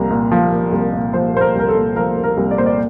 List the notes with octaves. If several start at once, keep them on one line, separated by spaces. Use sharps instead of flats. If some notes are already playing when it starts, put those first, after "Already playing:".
Already playing: C2 F3 A#3 A#5
A#2
F3
A#3
C2
A#2
F3 C5
A#3 C5
A#4
C2 A#4
A4
A#2
F3 A#4
A#3
A#4
C2
D5
A#2 C5
D5